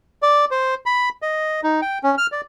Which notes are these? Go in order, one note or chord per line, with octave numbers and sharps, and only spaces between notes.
D5
C5
B5
D#5
D#4
G5
C#4
F6
D5